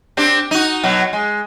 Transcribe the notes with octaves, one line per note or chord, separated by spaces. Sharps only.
C4 D4 G4
D#4 F#4
B2 F#3
G#3